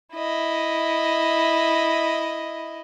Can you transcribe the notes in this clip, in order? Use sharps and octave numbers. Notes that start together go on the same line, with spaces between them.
E4 D#5